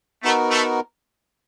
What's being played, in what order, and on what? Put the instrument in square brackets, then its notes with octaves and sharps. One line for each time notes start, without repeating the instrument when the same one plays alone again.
[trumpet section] A3 [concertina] B3 D#4 F#4 A#4
[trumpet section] A3